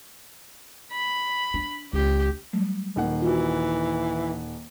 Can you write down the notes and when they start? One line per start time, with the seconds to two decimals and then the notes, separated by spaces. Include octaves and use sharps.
0.92 B5
1.54 D4
1.93 C#2 G4
2.53 F#3 G3 A3
2.96 D#1 D#3 F#5
3.22 E3 F4 F#4